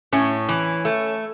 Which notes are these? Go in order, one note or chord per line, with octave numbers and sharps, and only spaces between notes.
A2 C#4
E3
A3